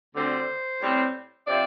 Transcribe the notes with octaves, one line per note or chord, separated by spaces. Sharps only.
D2 D3 G3 C4 C5
A2 G3 C4
C3 F3 D5